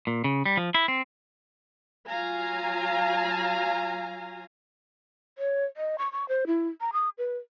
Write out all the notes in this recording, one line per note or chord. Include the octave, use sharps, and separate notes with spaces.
A#2
C#3
G3
F3
E4
C4
F#3 F4 F5 G#5 A#5
C#5
D#5
C#6
C#6
C5
E4
A#5
D#6
B4